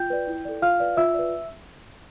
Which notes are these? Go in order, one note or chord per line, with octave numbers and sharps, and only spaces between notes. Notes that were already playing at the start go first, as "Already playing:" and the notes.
Already playing: F4 G5 G6
B4 D5
E4
A4 D5
F4 F5 F6
B4 D5
F4 E5 E6
B4 D5